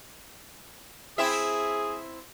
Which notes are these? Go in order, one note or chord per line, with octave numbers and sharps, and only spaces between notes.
C4 E4 G#4 E5